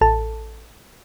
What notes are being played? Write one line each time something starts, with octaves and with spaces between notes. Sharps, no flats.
A1 A4 A5